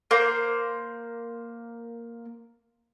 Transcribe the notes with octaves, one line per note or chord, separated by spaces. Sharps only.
A#3 C5